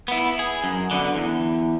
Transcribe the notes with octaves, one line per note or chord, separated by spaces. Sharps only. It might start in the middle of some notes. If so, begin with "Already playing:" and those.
B3 E4
G#4
F#2
D3 B3
E2